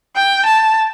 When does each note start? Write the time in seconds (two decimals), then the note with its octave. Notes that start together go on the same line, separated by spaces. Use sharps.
0.16 G5
0.46 A5